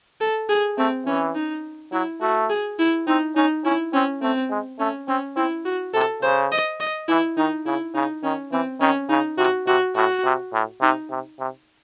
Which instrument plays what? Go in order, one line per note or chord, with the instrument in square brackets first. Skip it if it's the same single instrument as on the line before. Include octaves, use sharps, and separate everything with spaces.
[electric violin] A4
G#4
[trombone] A3 [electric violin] C4
[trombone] E3 [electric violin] C#4
[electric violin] D#4
[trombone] F#3 [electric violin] E4
[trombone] A3 [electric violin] F#4
[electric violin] G#4
E4
[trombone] C4 [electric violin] D#4
[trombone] C#4 [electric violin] D#4
[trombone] C#4 [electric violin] E4
[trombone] C4 [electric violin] C#4
[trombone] A3 [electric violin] C4
[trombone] G#3
[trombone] A3 [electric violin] C#4
[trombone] C4 [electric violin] C#4
[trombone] C4 [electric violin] E4
[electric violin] F#4
[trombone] C3 [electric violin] A4
[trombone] C#3 [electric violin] C5
[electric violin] D#5
D#5
[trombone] E3 [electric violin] E4
[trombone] D#3 [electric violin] D#4
[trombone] C#3 [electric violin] E4
[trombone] C#3 [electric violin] D#4
[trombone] D#3 [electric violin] C#4
[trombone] E3 [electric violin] C4
[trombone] D#3 [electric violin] C#4
[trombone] C#3 [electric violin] D#4
[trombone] C3 [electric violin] F#4
[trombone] C3 [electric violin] F#4
[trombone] A2 [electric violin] F#4
[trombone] C3
A2
[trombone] C3 [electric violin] D#4
[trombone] C3
C3